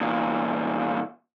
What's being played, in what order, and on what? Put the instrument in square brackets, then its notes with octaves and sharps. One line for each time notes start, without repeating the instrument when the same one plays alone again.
[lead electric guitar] E2 A#2